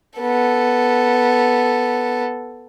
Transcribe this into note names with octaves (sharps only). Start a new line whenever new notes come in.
B3 A4